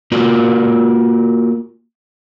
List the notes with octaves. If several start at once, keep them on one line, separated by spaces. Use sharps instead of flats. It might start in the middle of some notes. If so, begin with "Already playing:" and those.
A#3 F4 F#4 A#4 D5